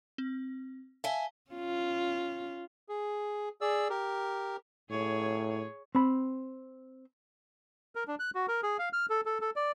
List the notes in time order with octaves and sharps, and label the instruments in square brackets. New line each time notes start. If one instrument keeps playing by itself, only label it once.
[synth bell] C4
[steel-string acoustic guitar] E5 G#5 [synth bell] F5 A5 G7
[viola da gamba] C#4 F4
[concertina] G#4
G#4 D5 E6
G4 A#4
[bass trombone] A2 [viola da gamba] G#4 C#5
[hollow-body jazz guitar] C4 B5
[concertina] A#4
D4
F#6
F#4
A#4
G#4
F5
F6
A4
A4
A4
D5